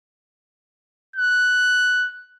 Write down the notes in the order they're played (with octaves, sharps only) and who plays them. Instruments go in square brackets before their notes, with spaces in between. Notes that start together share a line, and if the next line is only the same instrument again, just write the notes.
[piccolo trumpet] F#6